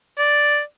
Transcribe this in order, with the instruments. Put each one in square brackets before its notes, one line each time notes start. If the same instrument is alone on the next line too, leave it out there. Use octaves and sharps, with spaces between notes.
[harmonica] D5